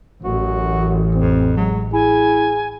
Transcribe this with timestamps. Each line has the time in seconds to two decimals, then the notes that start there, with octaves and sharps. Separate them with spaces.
0.24 A1 F#2 F#4
1.15 F2 C4
1.57 F#3 G#3
1.93 E4 G#4 G#5